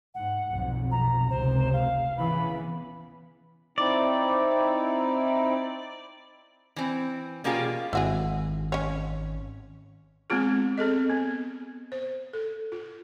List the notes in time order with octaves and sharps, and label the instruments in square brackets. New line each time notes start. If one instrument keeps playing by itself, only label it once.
[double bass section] G#2 [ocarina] F#5
[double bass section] B1 F2
[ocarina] A#5
[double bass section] F1 C#2 C3 [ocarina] C5
[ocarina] F5
[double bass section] C#3 E3 B3 [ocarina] B5
[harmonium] C4 D#4 E4 [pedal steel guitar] D5
[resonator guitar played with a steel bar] E3 C4
B2 A#3 C#4 F4 G4 G#4
[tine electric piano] G#1 [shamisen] E4 F#4 G#4
[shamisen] C#4 C#5
[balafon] G#3 B3 C4 F4 G#4
C4 G#4 A4 D#5
B3
C5
A4
F4